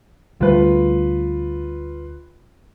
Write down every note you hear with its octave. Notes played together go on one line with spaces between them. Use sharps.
D2 G3 A3 F4 B4